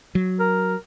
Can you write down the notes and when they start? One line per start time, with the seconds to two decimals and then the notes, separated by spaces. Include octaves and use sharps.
0.15 F#3
0.39 A#4